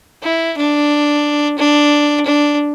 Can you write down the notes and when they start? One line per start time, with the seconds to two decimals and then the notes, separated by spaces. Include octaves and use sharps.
0.23 E4
0.57 D4
1.58 D4
2.25 D4